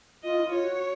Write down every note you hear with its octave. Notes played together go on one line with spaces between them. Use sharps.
F4 D#5
E4
F4
C#5
F#4